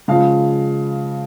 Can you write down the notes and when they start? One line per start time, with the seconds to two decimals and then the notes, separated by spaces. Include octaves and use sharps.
0.08 C#3 F3 G#3 F5